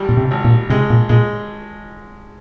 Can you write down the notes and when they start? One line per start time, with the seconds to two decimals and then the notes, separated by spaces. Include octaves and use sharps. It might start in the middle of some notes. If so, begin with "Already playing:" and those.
Already playing: G#1 G3
0.09 A#2
0.17 C3
0.31 G#1
0.44 A#2
0.70 C3 G#3
0.90 A#2
1.09 A#2 G#3